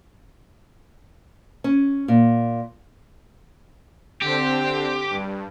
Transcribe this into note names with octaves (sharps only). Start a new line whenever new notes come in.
C#4
A#2
D3 C4 G4 C5
G2